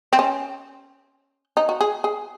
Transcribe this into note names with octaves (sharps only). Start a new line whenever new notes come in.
C4
C#4
D#4
F#4
G#4
G#4